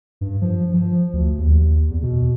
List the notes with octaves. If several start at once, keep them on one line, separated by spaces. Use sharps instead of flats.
G2
F3
F3
D2
D#2
E2
B2